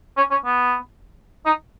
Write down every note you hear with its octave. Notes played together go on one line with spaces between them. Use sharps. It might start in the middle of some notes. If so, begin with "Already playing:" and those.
C#4
C#4
B3
D#4